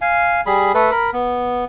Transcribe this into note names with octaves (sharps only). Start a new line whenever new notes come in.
F5 G#5
G3 G#4 B5
A3 A4 B4
A#4 B5
B3